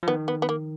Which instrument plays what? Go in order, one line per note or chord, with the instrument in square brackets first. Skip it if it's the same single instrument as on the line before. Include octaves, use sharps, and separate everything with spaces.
[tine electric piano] F3
[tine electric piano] D#3 [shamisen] B3
[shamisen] B3
B3
A#3